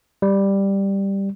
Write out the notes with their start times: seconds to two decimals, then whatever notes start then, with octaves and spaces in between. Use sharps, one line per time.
0.22 G3